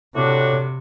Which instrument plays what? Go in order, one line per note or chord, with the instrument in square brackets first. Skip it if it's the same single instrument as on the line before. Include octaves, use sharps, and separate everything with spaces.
[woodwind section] A2 D4 F#4 [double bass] C3